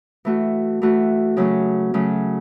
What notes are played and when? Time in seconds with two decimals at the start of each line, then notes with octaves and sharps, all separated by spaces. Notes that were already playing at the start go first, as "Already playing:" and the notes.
0.25 E3 A3 F#4
0.82 E3 A3 F#4
1.37 C#3 F#3 A3 C#4
1.94 C#3 F#3 A3 C#4